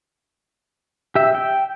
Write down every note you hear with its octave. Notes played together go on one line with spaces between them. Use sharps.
G4 E5
G5